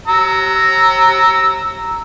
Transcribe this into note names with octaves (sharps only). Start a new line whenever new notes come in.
A#5 E6